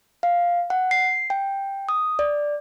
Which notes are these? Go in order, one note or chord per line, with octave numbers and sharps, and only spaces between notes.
F5
F#5
C7
G5
D#6
D5